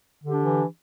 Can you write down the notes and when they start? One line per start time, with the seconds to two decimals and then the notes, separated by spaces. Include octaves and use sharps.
0.23 D3
0.28 G4
0.33 D4
0.38 E3